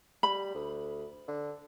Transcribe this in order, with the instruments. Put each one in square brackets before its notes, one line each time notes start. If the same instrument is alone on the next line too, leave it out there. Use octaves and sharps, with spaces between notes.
[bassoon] G3 [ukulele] B5
[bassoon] D2
D3